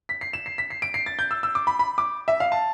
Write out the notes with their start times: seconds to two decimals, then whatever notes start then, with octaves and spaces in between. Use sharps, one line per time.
0.09 B6
0.21 C7
0.33 E7
0.46 C7
0.58 B6
0.70 C7
0.82 D7
0.94 C7
1.06 A6
1.19 G6
1.31 E6
1.43 E6
1.55 D6
1.67 B5
1.79 B5
1.98 D6
2.28 E5
2.40 F5
2.52 A5